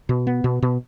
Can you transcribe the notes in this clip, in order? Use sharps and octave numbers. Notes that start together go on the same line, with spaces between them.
B2
B3
B2
B2